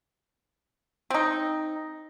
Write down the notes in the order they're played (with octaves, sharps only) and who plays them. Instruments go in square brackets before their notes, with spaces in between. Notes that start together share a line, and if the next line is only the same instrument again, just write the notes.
[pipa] C4 D#4